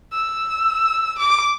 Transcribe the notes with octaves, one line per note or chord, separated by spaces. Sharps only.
E6
D6